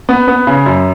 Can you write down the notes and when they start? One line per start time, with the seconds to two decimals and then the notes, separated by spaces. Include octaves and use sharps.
0.09 B3
0.28 B3
0.47 C#3
0.66 F#2